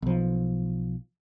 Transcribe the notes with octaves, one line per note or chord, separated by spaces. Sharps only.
B1 F3